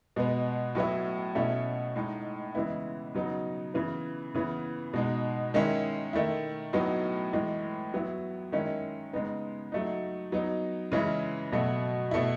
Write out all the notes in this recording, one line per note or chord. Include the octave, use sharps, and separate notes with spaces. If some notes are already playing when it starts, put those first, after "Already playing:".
B2 G#3 B3
A2 F#3 B3 E4
B2 A3 C#4 E4
A2 G#3 D#4
C#3 E3 G#3 B3 E4
C#3 F#3 B3 D#4
C#3 E3 B3
C#3 E3 B3
B2 G#3 D#4
D#3 G#3 C#4 E4
D#3 A3 E4
A2 F#3 B3 D#4
A2 E3 G#3
F#3 B3 E4
D#3 G#3 C#4 E4
C#3 G#3 B3 D#4
F#3 A3 D#4
F#3 B3 D#4
C#3 E3 G#3 C#4 E4
B2 F#3 A3
B2 A3 E4